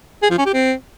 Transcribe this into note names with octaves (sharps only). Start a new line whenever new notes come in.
G#4
F3
C#4
G4
C4